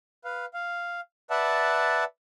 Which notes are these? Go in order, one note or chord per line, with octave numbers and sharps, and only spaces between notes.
B4 F5
F5
B4 D5 E5 F#5 A5